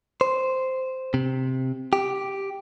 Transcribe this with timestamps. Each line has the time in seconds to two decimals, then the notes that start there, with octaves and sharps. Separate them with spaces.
0.21 C5
1.14 C3
1.93 G4